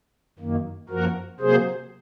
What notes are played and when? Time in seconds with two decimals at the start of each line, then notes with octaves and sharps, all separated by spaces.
0.39 F#2 D#3 A#3
0.89 F#2 F3 A#3 F#4 A#4
1.40 C3 F#3 A#3 G#4 C5